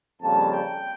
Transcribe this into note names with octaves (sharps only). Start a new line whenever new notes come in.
F2 C#3 G3 A#3 A5
G5